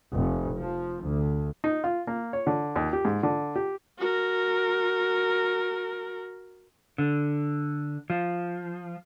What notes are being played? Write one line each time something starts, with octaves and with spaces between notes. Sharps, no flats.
F1
F3
D2
D#4
F4
A#3
C#5
D3
D#2
G4
G#2
D3
G4
F#4 A#4
D3
F3